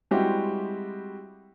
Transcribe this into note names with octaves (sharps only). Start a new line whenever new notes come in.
G3 G#3 C4 E4 F#4 G4